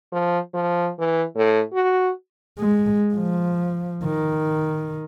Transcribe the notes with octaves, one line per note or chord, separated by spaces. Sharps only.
F3
F3
E3
A2
F#4
G#3
F3
D#3